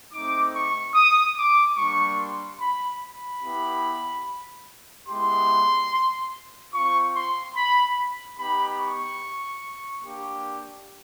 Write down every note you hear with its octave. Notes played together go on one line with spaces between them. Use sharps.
A3 C4 D#4 D6
C#6
D#6
D6
G3 A#3 D4 C#6
C6
B5
B5
B3 E4 G4
G#3 B3 E4 G4 C6
C4 F4 C#6
C6
B5
B3 D#4 G4 B5
C#6
A#3 D4 G4